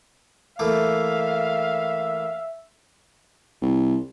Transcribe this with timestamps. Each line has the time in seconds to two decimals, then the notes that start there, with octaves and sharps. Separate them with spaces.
0.59 E3 A3 A#3 E5 F5
3.62 C2